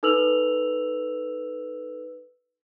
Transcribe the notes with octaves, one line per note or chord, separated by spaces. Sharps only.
D#4 A4 B4 E6 F7 F#7